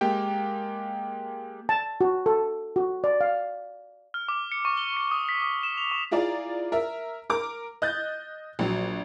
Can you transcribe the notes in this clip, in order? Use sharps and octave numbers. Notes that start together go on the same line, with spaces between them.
G#3 A#3 G4 G5
A5
F#4
A4
F#4
D5
F5
F6
D6
C#7
C#6
G7
C#7
D#6
B6
D#6
E7
F7
C#6
E4 F4 G#4 D5 A#5
A#4 E5
A#4 D6
D#5 F#6 G6 A6
A#1 F#3